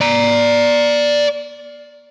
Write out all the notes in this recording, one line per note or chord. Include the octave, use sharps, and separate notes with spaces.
D5 A#5